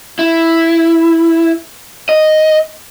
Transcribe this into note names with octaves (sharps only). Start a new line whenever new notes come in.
E4
D#5